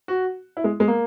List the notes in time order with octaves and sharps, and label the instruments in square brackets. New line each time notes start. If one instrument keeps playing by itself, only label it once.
[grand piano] F#4
E4
G#3
G#3
A#3